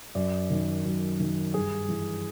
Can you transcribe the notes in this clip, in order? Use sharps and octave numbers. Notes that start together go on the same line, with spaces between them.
F#2 D5
D#3
F#2
D#3
G2 G#4
E3